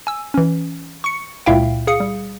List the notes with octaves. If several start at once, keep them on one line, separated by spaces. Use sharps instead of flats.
G#5 E6
E3 C#4
C#6 C#7
C#2 A#2 E4 E5 F5 G5
G#4 F5 D#6 C#7
G3